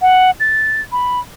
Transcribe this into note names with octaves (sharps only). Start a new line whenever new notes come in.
F#5
A6
B5